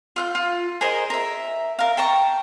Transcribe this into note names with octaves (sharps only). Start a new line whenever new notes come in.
F4 F6 G6
F4
G#4 A#4 C5 D#5
A#4 E5
A#4 F5
G5 A5 A#5 C#6